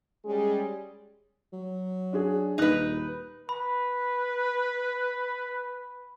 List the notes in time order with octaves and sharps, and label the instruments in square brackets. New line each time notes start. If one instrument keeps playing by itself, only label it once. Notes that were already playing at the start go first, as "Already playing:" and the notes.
[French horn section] G3 G#3 C#4 G#4
[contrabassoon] F#3
[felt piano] D4 F#4 G#4
[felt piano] D#1 F#6 [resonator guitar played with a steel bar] D#4 B4
[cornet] B4 [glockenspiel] B5